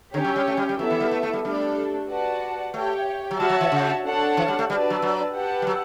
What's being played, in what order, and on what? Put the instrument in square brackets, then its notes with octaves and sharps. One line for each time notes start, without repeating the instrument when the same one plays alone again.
[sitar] D3 [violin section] C#4 G4 C#5 G5
[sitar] F#3
G3
A3
G3
G3
[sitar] F#3 [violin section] B3 E4 A4 E5
[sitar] E3
G3
A3
A3
G3
[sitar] G3 [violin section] A3 D4 A4
[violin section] F#4 B4 D5 F#5 A5
[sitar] A3 [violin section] G4 C#5 G5
[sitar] F#3
[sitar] G3 [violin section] F#4 C#5 E5 A5
[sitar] F#3
E3
C#3
[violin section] D4 A4 C#5 F#5 A5
[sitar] E3
G3
A3
[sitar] G3 [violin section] D4 F#4 B4 D5 A5
[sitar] F#3
F#3
[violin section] G4 B4 F#5 A5
[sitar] G3
F#3